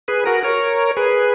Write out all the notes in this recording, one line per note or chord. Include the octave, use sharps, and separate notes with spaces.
G#4 B4
F#4 A#4
A#4 C#5
G#4 B4